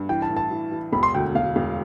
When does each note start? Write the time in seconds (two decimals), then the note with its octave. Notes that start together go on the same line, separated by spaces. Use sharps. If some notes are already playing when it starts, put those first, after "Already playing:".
Already playing: G2
0.09 E3 G5
0.22 A5
0.29 A2
0.37 A5
0.51 E3
0.71 E3
0.92 E1 B5
1.03 C6
1.14 D2 G5
1.35 E1 F5
1.56 E1